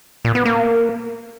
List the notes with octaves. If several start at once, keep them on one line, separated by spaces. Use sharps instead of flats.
A#2
B3
A#3